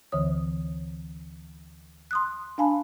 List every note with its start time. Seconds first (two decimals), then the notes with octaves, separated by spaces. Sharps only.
0.12 D2 D3 E3 C#5 D#6
2.11 C6 D#6 F#6
2.58 D4 F5 G#5 A5 B5